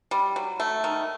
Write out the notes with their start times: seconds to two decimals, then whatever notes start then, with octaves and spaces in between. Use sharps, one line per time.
0.11 G3
0.36 F#3
0.60 A3
0.84 D#3